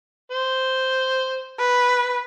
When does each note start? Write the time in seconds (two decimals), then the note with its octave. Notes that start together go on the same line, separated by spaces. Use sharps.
0.31 C5
1.59 B4